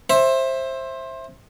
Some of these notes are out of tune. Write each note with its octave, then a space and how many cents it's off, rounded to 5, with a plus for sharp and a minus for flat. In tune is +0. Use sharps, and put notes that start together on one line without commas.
C5 +20 E5 +0